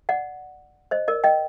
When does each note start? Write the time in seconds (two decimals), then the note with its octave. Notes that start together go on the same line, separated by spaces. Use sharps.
0.09 D5 F#5
0.91 C5 D#5
1.08 A#4 D5
1.24 D#5 G5